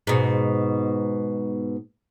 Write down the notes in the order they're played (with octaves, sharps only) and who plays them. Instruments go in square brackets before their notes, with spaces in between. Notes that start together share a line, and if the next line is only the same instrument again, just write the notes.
[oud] G#2 B2